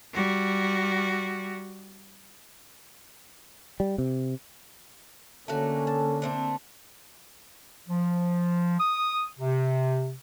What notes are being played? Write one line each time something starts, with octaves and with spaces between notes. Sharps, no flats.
G3 F#4
G3
C3
D3 A3 A#3 C#4 F#4 A4
A5
A3 C4 D4
F3
D#6
C3